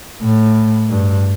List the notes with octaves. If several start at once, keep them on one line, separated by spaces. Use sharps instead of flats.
A2
G2